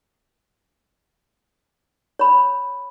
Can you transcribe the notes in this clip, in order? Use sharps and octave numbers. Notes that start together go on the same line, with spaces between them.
C#5 B5